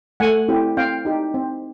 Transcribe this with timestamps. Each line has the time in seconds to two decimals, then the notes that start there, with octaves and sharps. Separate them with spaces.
0.20 A3 F#5 G#5
0.48 C4 E4 G4
0.77 C4 F5 G5
1.05 D#4 G4
1.34 C4